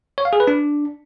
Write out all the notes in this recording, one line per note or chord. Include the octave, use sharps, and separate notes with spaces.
C#5
F5
G#4
B4
D4